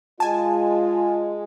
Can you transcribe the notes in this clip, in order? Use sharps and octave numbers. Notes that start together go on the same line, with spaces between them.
G#3 F4 G#5 A5